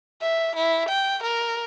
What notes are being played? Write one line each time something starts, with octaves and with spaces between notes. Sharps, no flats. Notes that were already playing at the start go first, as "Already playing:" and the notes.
E5
E4
G5
A#4